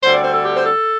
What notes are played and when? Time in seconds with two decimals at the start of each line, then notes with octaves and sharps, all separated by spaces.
0.03 D2 D3 G3 C4 C5
0.13 D5
0.24 C5
0.34 A4
0.44 G4
0.56 C5
0.65 A4